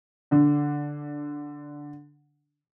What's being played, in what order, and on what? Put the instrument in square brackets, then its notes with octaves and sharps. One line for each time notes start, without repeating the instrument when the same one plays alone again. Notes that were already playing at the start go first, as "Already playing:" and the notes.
[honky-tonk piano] D3 D4